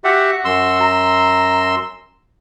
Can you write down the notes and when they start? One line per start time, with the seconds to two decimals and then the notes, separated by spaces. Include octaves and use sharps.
0.04 F#4 G4 E5 F#5
0.45 F#2 C6 E6
0.81 A#5